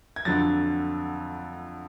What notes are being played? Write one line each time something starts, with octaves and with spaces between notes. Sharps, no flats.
G#6
F2 D3 F#3 A6